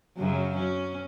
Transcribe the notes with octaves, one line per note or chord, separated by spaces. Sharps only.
F#2 C#3 F#3
F#3 C#4